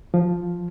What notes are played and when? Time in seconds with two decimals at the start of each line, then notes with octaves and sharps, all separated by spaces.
0.14 F3